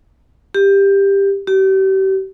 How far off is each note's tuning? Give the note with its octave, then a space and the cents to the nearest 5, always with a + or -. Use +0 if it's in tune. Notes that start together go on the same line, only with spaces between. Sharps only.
G4 +15
G4 -35